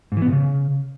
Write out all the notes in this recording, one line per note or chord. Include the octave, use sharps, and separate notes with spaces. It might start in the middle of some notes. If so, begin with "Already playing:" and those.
G#2
E3
B3
A#2
C#3